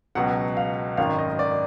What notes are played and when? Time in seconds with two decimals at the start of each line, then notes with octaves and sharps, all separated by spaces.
0.15 C#2 B2 F#3 F#5
0.57 F5
0.97 G#1 F#2 D#3 F5
1.19 D#5
1.39 D5